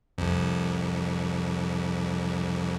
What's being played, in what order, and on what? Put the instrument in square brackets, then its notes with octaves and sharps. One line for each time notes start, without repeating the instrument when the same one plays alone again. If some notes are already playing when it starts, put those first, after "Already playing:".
[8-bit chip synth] C2 F2